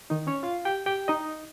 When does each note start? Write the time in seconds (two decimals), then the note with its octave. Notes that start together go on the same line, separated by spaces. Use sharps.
0.10 D#3 D#4
0.27 C#4 C#5
0.43 F4 F5
0.65 G4 G5
0.86 G4 G5
1.08 D#4 D#5